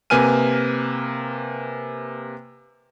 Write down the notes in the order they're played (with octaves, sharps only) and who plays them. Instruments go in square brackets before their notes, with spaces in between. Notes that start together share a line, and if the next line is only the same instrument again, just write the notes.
[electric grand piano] C3 A#3 B4 G#5 F6 D#7